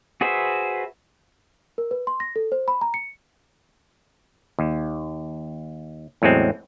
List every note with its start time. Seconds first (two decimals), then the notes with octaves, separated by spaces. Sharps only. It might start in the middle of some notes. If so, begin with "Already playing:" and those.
0.21 F#4 G#4 B4 C5 E5
1.78 A#4
1.91 B4
2.07 C6
2.20 A#6
2.36 A4
2.52 C5
2.68 B5
2.81 A#5
2.94 C#7
4.59 D#2
6.22 E2 A2 F#3 G#3 C4